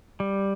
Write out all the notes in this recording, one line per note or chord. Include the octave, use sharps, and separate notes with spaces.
G3